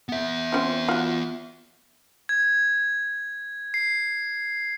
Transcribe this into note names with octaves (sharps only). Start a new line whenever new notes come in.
B3 E5
C4 C#4 F4
F4 F#4
G#6
C7